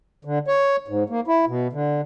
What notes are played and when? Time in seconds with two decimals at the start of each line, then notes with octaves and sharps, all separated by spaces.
0.25 D3
0.48 C#5
0.88 G#2
1.09 A#3
1.27 E4
1.47 B2
1.73 D3